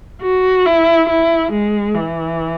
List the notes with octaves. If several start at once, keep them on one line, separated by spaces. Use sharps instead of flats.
F#4
E4
E4
G#3
E3